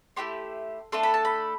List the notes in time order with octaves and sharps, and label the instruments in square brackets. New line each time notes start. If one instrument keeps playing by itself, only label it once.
[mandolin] A3 C4 E4 G4 C6
A3 D4 A4 C6
B5
A5
B5